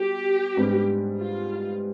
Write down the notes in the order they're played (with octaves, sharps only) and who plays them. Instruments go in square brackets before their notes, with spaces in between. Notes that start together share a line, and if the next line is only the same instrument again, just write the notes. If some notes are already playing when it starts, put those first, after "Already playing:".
Already playing: [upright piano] B2 G3 [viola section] G4
[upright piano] G#2 G3 B3 D4
[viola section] F4